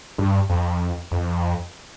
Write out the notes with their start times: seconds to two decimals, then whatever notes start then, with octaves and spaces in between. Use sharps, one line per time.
0.18 G2
0.49 F2
1.11 F2